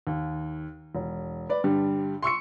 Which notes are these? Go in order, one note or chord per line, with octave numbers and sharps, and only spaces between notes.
D#2
E1
B4 D5
G2 D3 G3
C6 C#6 E6 C#7